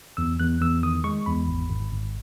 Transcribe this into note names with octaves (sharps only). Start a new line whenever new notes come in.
E2 E6
E2 F#6
E2 E6
D#3 D#6
G#3 C#6
E2 B5
G#1
G#1
G#1